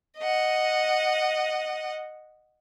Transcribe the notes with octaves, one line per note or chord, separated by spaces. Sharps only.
D#5 F#5